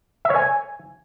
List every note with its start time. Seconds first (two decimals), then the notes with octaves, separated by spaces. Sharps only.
0.25 E5
0.30 C#5
0.36 G#5